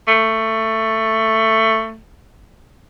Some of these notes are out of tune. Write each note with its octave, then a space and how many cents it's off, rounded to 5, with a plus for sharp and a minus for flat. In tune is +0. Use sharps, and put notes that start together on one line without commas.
A3 +15